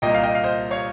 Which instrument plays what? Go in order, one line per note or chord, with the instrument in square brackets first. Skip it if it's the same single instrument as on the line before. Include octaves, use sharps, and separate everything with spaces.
[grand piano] C2 A#2 D#5 G5
F5
D#5 G5
F5
C5 D#5
C#5 F5